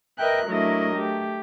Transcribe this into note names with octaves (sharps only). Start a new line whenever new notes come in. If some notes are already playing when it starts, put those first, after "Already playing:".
A#4 B4 D#5 E5 G5 F#6
F#3 A3 D4 E4 A#4 D#5
A3 G4